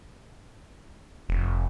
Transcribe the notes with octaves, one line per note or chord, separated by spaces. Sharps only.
F1